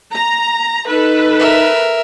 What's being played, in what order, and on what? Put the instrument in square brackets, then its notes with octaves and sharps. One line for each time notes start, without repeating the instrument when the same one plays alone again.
[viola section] A#5
[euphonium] D#4 [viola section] A4 B4
[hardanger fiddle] A#4 E5